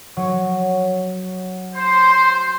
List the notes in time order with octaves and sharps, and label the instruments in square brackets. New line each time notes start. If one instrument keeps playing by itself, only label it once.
[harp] F#3 C#5
[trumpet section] C5 [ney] C6